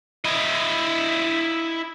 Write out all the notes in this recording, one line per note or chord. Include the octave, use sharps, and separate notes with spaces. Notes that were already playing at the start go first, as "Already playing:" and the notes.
E4 D#5